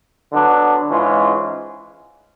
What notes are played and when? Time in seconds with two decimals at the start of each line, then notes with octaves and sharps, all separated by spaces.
0.32 D3 F#3 B3 D4
0.89 G#2 E3 G#3 C#4 F4